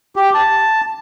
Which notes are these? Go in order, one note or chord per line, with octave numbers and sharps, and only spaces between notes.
G4
A5